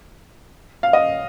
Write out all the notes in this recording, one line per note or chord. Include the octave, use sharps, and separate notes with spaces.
F5
D#5